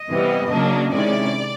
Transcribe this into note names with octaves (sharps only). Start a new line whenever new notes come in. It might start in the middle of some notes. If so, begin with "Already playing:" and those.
Already playing: D#5
C3 E3 G3 B3
C#3 F#3 A#3 D4
C3 D#3 G#3 C#4 E4 D5